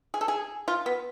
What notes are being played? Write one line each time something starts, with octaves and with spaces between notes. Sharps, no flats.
G#4
A4
G#4
F4
B3